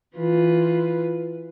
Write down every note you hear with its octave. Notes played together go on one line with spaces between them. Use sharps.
E3 F4 B4